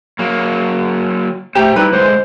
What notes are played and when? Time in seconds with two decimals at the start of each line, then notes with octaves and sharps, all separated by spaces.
0.19 F#3 A#3
1.55 A3 G4 C5 A#5
1.76 G3 D#4 E4 B4
1.93 D3 G#3 C5